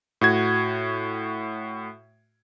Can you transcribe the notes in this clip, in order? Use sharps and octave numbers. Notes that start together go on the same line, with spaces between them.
A2 F#4 G#6